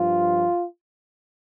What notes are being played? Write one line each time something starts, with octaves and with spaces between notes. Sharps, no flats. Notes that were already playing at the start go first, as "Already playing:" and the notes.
Already playing: G2 F3 F4